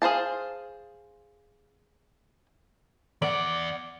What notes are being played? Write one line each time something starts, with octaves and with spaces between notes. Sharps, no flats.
G#4 C5 F5 A5
E2 D5 F#5